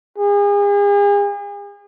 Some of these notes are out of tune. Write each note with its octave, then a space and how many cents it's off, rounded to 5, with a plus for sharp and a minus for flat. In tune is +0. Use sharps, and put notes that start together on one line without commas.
G#4 -40